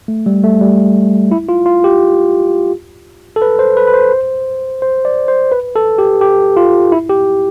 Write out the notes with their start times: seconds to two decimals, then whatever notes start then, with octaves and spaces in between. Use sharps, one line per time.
0.08 A3
0.26 G3
0.44 A3
0.61 G3
1.31 E4
1.49 F4
1.66 F4
1.84 G4
3.36 A4
3.42 B4
3.59 C5
3.77 B4
3.87 B4
3.93 C5
4.82 C5
5.05 D5
5.28 C5
5.52 B4
5.76 A4
5.98 G4
6.21 G4
6.57 F4
6.92 E4
7.09 G4